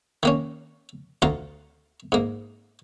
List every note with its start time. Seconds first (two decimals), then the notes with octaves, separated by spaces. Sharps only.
0.23 D#3 A#3 C#4
1.22 D2 F4 F5 F#5 A#5
2.12 G#2 A#3